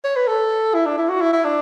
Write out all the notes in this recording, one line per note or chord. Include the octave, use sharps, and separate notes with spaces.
C#5
B4
A4
E4
D4
E4
F#4
E4
E4
D4